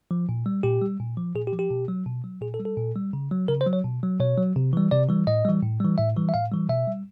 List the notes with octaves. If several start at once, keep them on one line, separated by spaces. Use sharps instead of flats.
F3
A#2
G3
A#2 G4
G3
A#2
F3
A#2 G#4
G4
F3
G4
B2
F#3
B2
F#3
A#2 G#4
A4
G3
A4
A#2
G3
C#3
F#3
C#3 A#4
C5
F#3
C#5
B2
F#3
B2 C#5
F#3
C3
E3 G3
C3 D5
E3 G3
A2 D#5
E3 G3
A2
E3 G3
A2 E5
E3 G3
E5
A2 F5
E3 G3
B2 E5
G3